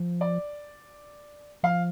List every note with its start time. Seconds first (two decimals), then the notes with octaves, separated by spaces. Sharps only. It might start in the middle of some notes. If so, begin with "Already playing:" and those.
Already playing: F3
0.21 D5
1.63 F3 F5